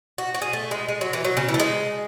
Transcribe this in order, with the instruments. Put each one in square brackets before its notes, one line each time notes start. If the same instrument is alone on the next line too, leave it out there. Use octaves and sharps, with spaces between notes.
[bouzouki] F#4
F#4
G#4
A3
G#3
G#3
F#3
E3
F#3
C#3
E3
A3
G#3